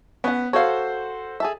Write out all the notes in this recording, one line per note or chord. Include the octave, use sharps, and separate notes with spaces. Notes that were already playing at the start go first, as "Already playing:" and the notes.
B3 C#4 F#5
F#4 A4 C5 C#5 F5
G#4 A4 E5